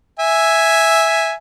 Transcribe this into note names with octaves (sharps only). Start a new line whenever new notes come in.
E5 G#5